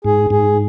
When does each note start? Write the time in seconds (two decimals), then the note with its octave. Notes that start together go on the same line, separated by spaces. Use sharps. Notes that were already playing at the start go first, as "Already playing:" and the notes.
0.04 G#2 G#4
0.30 G#2 G#4